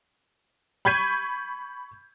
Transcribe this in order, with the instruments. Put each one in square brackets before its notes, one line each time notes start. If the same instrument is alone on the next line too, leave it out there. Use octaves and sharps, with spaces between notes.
[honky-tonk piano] B5 C#6 G6 G#6 B6 D#7